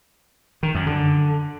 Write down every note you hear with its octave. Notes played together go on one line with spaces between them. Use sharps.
D#3
F#2
D3